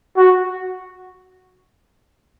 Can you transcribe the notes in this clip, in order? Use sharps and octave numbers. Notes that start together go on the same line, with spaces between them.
F#4